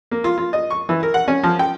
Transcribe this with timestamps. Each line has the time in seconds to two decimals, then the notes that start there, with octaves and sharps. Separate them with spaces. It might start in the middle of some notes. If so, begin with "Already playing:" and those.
0.11 A#3
0.24 F4
0.38 F4
0.53 D#5
0.71 C#6
0.89 E3
1.03 A#4
1.14 F#5
1.28 C#4
1.43 F3
1.59 G5